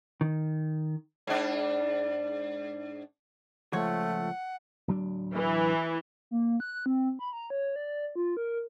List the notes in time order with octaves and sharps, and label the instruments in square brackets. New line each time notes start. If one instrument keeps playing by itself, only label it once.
[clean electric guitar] D#3
[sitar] G#2 D4
[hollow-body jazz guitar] C#2 F3 C#5 [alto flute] A3 [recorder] F#5
[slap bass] D1 F#3 D4
[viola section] E3
[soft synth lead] A#3
F#6
C4
B5
A#5
C#5
D5
F4
A#4